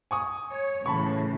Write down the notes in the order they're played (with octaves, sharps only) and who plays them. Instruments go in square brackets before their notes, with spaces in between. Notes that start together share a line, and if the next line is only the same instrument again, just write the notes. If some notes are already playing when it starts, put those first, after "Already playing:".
[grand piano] G#5 C#6 D#6
[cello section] C#5
[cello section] A2 C#3 E3 [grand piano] A5 B5 C#6